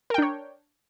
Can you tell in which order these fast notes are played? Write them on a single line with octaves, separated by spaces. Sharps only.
A#4 G5 D4 C#5